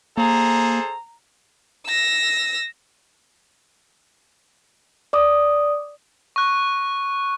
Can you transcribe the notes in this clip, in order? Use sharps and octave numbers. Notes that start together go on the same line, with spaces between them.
A#3 G#4 A4 C5 A#5
E6 A#6
D5 D6 D#6
C#6 F#6